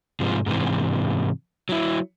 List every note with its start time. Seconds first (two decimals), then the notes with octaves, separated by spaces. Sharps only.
0.20 G#2 C3 F3
0.46 G#2 C3 E3
1.69 F#3 E4